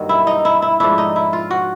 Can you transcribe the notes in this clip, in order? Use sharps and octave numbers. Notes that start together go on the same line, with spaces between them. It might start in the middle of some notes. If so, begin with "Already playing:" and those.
Already playing: G2 D#3 F#3 A#3
E4
D#4
E4
E4
G#2 F3 A3 D4 E4
D#4
E4
F4
F#4